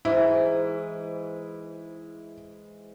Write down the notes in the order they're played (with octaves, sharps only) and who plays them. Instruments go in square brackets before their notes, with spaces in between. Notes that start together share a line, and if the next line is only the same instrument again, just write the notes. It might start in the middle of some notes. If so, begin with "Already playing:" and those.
[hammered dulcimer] G#2 E3 [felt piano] E4